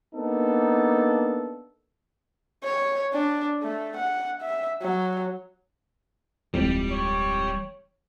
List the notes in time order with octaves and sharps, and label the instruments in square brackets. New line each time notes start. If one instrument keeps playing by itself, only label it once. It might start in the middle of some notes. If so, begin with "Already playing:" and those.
[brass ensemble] A#3 B3 D4 D#4 A4
[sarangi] C#5
D4
A3
F#5
E5
F#3
[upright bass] D1 G#3 [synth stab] F2 A2 [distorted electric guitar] G3
[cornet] C#5